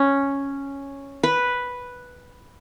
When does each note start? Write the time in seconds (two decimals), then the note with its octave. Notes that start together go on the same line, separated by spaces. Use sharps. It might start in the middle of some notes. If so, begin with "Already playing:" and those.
Already playing: C#4
1.23 B4